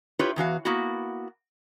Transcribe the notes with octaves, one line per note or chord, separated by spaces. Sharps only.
E4 F4 G4 B4 C#5
E2 E3 F#4 F5
A#3 B3 E4 F#4